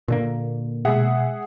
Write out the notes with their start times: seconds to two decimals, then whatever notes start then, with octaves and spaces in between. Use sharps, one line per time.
0.08 A#2 D3 A#3
0.85 B2 G#3 G#4 E5 F#5